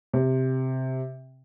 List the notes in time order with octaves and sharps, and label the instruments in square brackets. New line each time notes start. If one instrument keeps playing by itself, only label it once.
[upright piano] C3